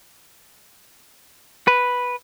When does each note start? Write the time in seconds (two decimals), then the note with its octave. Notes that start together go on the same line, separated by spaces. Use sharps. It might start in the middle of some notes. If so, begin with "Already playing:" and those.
1.68 B4